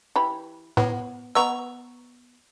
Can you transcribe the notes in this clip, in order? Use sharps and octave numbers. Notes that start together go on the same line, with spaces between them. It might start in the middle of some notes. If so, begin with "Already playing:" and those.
E3 G4 B5
A2 B3
B3 D#5 A#5 C#6 E6